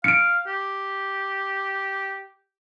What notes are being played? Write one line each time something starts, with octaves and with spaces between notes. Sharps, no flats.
F5 C#7 D7
G4